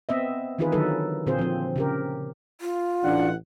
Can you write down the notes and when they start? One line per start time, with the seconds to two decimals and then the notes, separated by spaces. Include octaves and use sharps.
0.09 B3 C4 D#5 E5
0.58 D#3 E3 D#4 F4 G#4 B4
0.72 D3 D#3 F#3 D#4 A4 B4
1.26 A#2 D3 C4 F4 G#4 C5
1.39 F3 C4
1.76 C#3 G4 A#4
2.61 F4
3.04 A1 D4 F#5